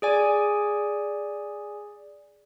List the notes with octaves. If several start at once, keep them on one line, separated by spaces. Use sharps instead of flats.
G#4 D5 G#5